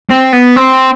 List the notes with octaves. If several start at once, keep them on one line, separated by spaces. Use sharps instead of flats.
C4
B3
C4